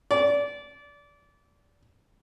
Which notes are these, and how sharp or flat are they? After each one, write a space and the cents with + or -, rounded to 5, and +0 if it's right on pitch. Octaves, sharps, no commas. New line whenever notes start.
D5 -25